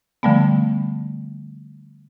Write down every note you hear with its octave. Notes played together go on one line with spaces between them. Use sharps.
D3 F3 G3 A3 B3